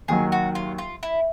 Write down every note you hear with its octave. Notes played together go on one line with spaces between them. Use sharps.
D#2 D#3 F#3 G#4
F#4
F4
F4
E4